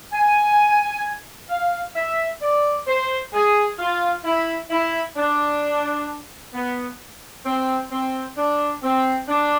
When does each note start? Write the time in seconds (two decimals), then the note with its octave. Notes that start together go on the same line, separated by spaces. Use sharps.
0.12 G#5
1.49 F5
1.96 E5
2.41 D5
2.87 C5
3.33 G#4
3.79 F4
4.24 E4
4.70 E4
5.16 D4
6.53 B3
7.45 C4
7.92 C4
8.37 D4
8.83 C4
9.29 D4